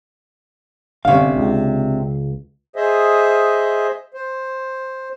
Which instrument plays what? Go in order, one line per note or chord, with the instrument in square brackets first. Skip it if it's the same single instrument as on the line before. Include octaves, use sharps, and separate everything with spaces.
[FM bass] G1 [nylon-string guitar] C3 D4 [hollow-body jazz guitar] C#4 F5
[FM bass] C#2
[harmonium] G#4 C5 D#5 E5
C5